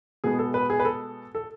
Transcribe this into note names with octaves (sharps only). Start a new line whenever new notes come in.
B2 G#3 B3 G#4
A4
B4
G#4
B4
A4
A4